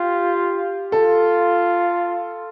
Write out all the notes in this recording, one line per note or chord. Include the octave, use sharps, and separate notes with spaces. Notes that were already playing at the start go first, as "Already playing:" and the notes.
Already playing: F4 G4
F4 A4